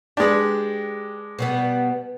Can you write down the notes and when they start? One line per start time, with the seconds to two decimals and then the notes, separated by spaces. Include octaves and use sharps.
0.17 G#3 D4 G4 B4
1.39 B2 G3 B3